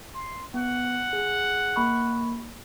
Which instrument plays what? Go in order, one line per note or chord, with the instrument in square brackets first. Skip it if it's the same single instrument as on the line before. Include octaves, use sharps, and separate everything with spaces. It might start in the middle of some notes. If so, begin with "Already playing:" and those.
[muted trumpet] C6
[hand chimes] B3 [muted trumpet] F#5
[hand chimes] G#4
A#3 B5 C#6